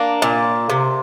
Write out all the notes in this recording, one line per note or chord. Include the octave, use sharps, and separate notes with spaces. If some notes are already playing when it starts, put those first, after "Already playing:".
Already playing: A#3 D4
A#2
C3